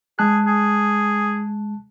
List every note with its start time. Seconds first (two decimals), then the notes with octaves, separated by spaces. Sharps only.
0.19 G#3 G#4 A5 F#6
0.46 G#4